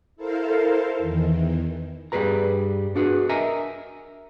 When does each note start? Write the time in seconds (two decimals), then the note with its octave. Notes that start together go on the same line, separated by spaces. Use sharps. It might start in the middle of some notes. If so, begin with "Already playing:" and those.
0.16 E4 A4 A#4 C5 F5
0.98 E2 D#3 E3
2.12 G2 G3 G#4 B4 A#5
2.96 D4 F#4 G#4 B4
3.29 A#4 D#5 E5 G#5 A#5